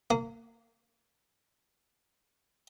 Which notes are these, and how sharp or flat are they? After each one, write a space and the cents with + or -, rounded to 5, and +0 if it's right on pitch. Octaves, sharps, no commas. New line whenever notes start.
A#3 -25